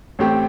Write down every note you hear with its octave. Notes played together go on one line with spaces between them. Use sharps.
A1 A2 A3 C4 G4